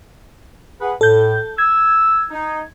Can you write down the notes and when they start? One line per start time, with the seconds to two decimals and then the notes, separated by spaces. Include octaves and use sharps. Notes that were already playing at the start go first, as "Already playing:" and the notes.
0.81 G#4 B4 F#5
1.01 A2 A4 G6
1.58 E6 G#6
2.30 D#4